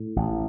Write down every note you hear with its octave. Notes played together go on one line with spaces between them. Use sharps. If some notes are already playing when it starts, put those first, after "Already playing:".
Already playing: A2
A1